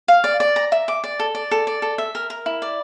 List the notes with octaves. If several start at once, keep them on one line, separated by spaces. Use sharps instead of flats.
F5
D5
D5
A#5
E5
D6
D5
A4
D5
A4
D5
A4
E5
A#4
A#4
E4
D5